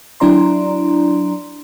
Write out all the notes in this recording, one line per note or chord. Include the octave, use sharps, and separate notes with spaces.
F#3 D4 E4 D5 A#5 C6